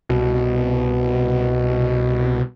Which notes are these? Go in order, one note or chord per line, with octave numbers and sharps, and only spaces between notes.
C2 B2